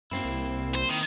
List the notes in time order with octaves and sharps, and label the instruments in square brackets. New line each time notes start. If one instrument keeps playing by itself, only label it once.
[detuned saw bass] F#2 [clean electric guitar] A#3 C4 E4
[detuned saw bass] C2
[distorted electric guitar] C5
D#3